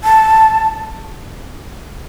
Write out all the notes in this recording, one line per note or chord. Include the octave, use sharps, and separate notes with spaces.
A5